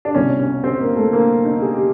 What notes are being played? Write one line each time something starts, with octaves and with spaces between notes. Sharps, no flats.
D4
C2 B2 C#4
C#4
C4
A#3
A3
A#3
D#4
G#4
G4